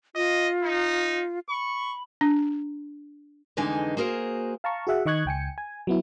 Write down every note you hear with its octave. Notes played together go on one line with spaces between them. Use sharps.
F4 D#5
D#4
B5 C#6
D4
F2 D3 E3 G#3 D#4 G#5
A#3 F#4 G#4 A#4 C5
F5 A5 A#5 C#6
F#4 G#4 E5 F#5
D#3 D#5 C#6 F#6 G#6
C#2 G5 G#5 C#7
G#5
F#3 B3 E4